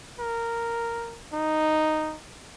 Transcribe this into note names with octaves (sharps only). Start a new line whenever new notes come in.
A#4
D#4